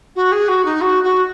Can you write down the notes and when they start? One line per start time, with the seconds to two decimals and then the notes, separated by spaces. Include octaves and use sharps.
0.15 F#4
0.31 G#4
0.48 F#4
0.65 D#4
0.81 F#4
1.03 F#4